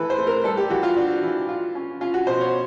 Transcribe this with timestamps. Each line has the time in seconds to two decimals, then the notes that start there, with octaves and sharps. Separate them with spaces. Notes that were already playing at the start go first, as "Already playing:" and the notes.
Already playing: E3 A3 A4 B4
0.10 C5
0.18 A3
0.27 A#4
0.44 G3 A4
0.57 G4
0.70 E3 F#4
0.83 F4
0.96 D4 F#4
1.23 E3
1.49 F4
1.75 C#4
2.01 C#4 F4
2.14 F#4
2.27 B2 C5
2.41 C#5